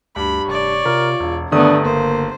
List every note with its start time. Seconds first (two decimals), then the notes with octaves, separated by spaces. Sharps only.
0.16 D2 G2 B5
0.47 F1 C#5 D5
0.85 C3 F4 A#4
1.20 E1 E2
1.52 G1 D#3 A3 B3 D4 D#6
1.85 F#1 A#3 C5